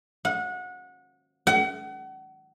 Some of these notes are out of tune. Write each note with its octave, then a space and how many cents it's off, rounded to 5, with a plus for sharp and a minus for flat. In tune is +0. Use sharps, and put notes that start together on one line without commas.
F#5 -25
F#5 +35